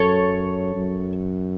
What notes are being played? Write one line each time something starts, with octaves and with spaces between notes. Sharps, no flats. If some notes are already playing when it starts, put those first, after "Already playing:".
Already playing: F#2 A4 C#5
F#2